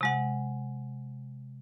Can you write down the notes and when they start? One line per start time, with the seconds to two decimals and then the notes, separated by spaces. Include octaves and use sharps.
0.01 C3 G#3 F#5